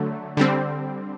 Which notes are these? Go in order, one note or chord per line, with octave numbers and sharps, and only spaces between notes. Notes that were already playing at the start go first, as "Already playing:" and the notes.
Already playing: D3 F#3 A3
D3 G3 C4